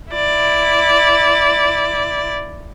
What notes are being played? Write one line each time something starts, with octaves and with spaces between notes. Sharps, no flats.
E4 D5